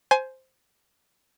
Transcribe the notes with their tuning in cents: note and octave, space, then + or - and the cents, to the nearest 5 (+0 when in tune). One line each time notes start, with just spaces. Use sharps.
C5 +0 G#5 +20